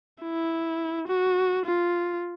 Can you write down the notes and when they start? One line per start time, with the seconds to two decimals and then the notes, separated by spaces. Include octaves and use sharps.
0.22 E4
1.08 F#4
1.65 F4